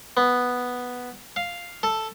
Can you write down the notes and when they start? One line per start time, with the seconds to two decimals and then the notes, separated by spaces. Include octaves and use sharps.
0.17 B3
1.36 F5
1.83 A4